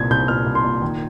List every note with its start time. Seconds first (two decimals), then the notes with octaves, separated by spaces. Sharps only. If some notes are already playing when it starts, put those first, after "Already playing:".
Already playing: C2 A#2 G#6
0.10 C2 G6
0.28 A#2 F6
0.46 C2
0.55 C6
0.64 A#2
0.82 D#3